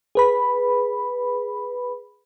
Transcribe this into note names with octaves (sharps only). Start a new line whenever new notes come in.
G#4 B4 B5